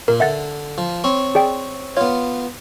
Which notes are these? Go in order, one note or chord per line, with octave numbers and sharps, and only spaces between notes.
A#2 A#4
D3 E5 F#5 A6
F3
C4 C#5
G#4 D5 G5
B3 F4 C#5